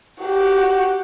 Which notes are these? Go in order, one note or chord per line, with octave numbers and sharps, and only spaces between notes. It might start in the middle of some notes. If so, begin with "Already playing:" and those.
F#4 G4